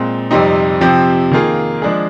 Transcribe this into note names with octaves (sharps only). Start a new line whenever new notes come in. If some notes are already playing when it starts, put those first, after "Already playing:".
Already playing: A#2 G#3 C4
F2 C3 G3 C4 D#4
C3 F3 C4 G4
D#3 A#3 F4 G#4
F3 G#3 D4 G#4